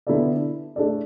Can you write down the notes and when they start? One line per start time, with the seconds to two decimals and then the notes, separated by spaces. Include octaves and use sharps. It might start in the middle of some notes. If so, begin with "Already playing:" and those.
0.07 D3 B3 E4 A4 D5
0.76 A3 D4 A4 D5